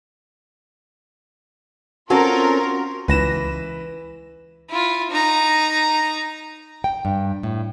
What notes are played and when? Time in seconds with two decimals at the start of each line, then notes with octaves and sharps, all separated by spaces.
2.10 C4 C#4 F4 F#4 A4 A#4 C6
3.08 C#2 E3 B4 A#6 E7
4.70 E4 F4
5.10 D#4 A#5
6.84 G5
7.05 G2
7.43 A2